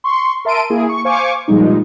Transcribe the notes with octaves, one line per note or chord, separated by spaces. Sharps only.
C6 C#6
A#4 E5 A5 C6 D7 D#7
A#3 E4 G#4
C#6
C5 F5 G#5 C#6 D6
A#2 F3 G3 G#3 D#4